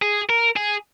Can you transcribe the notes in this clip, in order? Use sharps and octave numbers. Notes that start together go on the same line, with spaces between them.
G#4
A#4
G#4